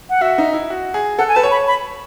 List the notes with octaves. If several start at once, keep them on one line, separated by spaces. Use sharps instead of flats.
F#5
F#4 E5
D#4
E4
F#4
G#4
A4 F#5
G#5
B4 A5
C#5
B5
B5